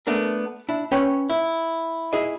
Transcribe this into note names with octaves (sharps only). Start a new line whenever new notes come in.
A3 B3 D4 A#4
D4 E4
C#4 B4 C#5 G5
E4
E4 G#4 D#5